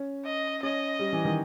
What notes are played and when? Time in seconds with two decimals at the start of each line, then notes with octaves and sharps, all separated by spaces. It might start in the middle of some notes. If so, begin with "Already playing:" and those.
Already playing: C#4
0.25 D#5
0.62 C#4 D#5
0.99 G3
1.13 E3
1.25 D#3